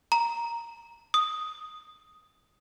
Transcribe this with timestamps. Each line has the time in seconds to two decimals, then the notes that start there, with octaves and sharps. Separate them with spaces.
0.12 A#5
1.14 D#6